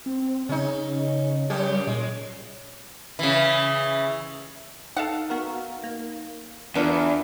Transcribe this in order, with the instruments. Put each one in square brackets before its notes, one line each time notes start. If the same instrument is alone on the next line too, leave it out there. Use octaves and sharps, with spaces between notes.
[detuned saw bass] C4
[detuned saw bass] C#3 [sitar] C#4 D#4
[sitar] F#2 C#4 G4 [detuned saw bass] G3
[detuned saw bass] A#2 [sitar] G#3
[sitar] C#3 E3
[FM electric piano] D#4 [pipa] A4 F5 F#5
[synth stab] B3 F#4 A#4
A#3
[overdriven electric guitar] E2 [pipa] D3 [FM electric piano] B3 D4 F4 [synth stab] A#4 B4 E5